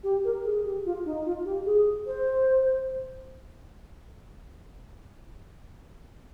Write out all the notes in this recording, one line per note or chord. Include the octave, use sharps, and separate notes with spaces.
G4
A#4
G#4
G4
F4
D#4
F4
G4
G#4
C5